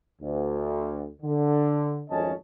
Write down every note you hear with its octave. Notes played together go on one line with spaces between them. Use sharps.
D2
D3
G#1 F2 A3 C#4 D#5 A5